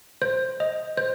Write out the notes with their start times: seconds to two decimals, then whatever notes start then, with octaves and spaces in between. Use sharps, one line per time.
0.22 C5
0.60 D#5
0.97 C5